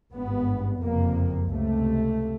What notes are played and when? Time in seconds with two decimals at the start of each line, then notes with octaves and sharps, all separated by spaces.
0.13 G#1 G2 B3
0.82 F#1 F2 C3 A#3
1.51 C#2 C3 A3